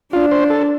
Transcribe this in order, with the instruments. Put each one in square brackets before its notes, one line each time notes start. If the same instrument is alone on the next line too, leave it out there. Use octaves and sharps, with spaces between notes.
[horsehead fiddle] D4 [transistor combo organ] F4
[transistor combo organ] C5
A4